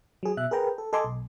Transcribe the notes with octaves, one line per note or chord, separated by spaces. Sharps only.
F#3 G#4
B2 E5 F#6
G#4 A#4 B4 G5 A#5
A4
A4 D#5 G#5 C6 D6
B1